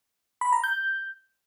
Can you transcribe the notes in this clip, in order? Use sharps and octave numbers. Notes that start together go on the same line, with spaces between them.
B5
A#5
G6